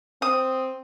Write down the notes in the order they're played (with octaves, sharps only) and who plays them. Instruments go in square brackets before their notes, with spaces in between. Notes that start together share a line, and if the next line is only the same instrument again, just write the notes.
[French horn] C4 [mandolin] D#6